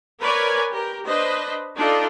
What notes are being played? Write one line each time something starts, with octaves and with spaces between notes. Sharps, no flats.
A#4 B4 C#5 D5 G#5
G4 A#4
D4 B4 C5 D#5
D4 D#4 F4 A4 D5 D#5